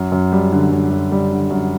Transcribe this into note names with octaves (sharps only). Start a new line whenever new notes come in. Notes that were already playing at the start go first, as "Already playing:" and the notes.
Already playing: F#2
F#2
G3
D3
F#2
F#2
G3
D3
F#2